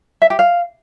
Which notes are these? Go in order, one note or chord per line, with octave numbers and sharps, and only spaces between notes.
E5
G4
F5